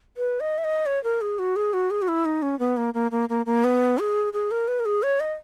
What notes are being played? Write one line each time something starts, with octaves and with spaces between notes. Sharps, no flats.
B4
D#5
E5
D#5
C#5
A#4
G#4
F#4
G#4
F#4
G#4
F#4
E4
D#4
C#4
B3
A#3
A#3
A#3
A#3
A#3
B3
G#4
G#4
A#4
B4
A#4
G#4
C#5
D#5